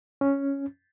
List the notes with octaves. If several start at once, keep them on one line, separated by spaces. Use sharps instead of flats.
C#4